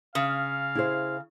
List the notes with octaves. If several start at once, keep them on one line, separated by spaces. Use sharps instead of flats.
C#3 F5
E4 G#4 C5